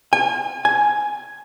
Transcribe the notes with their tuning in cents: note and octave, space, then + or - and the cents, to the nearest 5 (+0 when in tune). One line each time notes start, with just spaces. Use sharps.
G#5 -35
G#5 +10